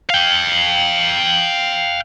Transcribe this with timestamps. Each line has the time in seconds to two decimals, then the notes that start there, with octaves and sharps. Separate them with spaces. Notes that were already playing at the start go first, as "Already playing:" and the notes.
0.10 F5 G5